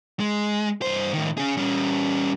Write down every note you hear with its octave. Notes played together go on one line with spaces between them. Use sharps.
G#3
G2 C5
A2 D#3
C#4 G#4
G3 C#4